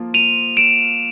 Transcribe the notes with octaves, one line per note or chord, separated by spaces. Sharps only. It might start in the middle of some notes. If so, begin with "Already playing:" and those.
Already playing: F3 A#3 F4
D#7 F7
D7 E7